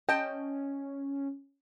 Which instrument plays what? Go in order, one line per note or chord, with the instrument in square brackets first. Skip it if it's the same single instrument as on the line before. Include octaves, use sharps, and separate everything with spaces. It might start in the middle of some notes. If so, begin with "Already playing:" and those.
[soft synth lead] C#4 [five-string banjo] D#5 A5 [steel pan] G5